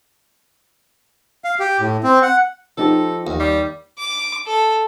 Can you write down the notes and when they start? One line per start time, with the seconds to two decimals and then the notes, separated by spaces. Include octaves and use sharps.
1.44 F5
1.60 G4
1.80 A2
2.04 C4
2.22 F#5
2.77 F3 D#4 G4 A4
3.27 D#2
3.40 G3
3.98 D6
4.47 A4